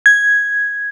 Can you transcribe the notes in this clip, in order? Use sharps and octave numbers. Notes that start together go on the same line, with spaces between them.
G#6